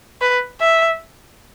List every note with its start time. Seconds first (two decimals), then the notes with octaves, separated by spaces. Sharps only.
0.21 B4
0.61 E5